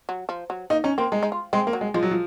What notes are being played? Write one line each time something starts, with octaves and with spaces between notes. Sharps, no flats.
F#3
F3
F#3
A#3 D#4
C#4 D#4
A#3 C4
G#3 D#4
D#4
F4
G#3 C4
A#3
F#3
G#3
F3 G#3
F#3
F3